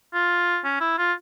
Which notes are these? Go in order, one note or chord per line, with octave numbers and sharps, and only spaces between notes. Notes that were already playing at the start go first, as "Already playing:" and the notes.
F4
C#4
E4
F4